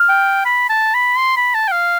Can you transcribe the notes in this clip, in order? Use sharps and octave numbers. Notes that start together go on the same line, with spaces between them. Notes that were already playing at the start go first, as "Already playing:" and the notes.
Already playing: F6
G5
B5
A5
B5
C6
B5
A5
G5
F5